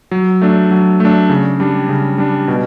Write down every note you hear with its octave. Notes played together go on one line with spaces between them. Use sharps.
F#3
A3 D4
F#3
A3 D4
C#3
G3 D4
C#3
G3 D4
B2